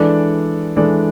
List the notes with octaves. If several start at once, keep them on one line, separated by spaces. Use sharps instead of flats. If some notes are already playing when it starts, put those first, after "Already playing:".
Already playing: E3 G#3 D4 A4 D5
E3 G#3 D4 A4 D5